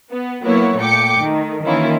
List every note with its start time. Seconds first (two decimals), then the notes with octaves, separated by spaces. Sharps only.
0.11 B3
0.44 F#3 A#3 B3 E4 C#5
0.78 A#2 A3 G5 D6 C#7
1.20 D#3 A3
1.64 D#3 E3 A#3 C#4 E4 F4